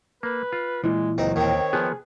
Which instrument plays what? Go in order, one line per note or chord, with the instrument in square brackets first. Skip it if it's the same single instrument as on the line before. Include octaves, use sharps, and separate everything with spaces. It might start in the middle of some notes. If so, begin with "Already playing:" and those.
[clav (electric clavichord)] A#3 [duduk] B4
[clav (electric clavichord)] F4
[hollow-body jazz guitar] A#2 E3 [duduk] G#3
[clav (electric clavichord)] C#2 [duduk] F#3 [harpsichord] C4 D#4
[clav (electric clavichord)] D#2 [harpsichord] D#3 C4 [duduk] C#5
[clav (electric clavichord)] F3 B3 [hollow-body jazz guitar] G#4